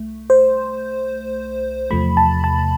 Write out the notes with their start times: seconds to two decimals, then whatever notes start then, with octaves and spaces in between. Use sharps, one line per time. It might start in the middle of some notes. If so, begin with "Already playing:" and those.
Already playing: C2 A3
0.30 C5
1.90 E2 C3 F3 A3 B5
2.17 A5
2.44 A5